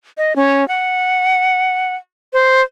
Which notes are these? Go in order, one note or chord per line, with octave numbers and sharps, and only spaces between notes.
D#5
C#4
F#5
C5